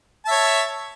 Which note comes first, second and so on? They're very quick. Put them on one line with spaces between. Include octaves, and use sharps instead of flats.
A5 E5 C#5